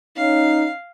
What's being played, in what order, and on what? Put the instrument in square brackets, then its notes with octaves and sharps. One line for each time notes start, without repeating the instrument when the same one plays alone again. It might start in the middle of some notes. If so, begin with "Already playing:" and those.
[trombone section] C#4 D#4 [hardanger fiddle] F5